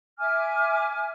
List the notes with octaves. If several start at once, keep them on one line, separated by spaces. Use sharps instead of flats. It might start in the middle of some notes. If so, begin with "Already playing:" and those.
E5 G#5 D6 F6